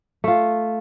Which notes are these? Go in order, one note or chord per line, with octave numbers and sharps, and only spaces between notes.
A3 F4